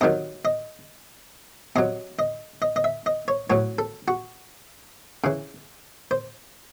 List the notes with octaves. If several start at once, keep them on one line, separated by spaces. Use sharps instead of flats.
C3 D#3 F#3 D#5
D#5
C3 F#3 D#5
D#5
D#5
D#5
E5
D#5
C#5
A2 F#3 C#5
A4
F#4
C#3 E3
C5